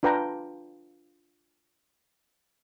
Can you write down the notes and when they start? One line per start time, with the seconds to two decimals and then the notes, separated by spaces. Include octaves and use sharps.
0.03 D4 F4 B4 G5 A#5